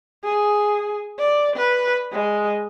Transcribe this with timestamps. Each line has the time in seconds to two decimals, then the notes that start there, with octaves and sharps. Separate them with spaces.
0.24 G#4
1.19 D5
1.56 B4
2.12 G#3